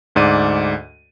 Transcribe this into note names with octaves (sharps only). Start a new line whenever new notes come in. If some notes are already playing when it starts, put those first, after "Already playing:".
D2 G#2 D5 D#7